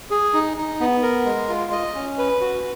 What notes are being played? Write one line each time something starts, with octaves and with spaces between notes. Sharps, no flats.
G#4
D#4
D#4
B3
A#4
G#3
F4
D#5
C#4
B4
F#4